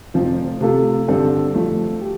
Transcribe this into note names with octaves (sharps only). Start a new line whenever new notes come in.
F1 F2 F3 C4
C3 A3 F4 A4
G2 D3 G3 C4 A4
F2 F3 A3
G4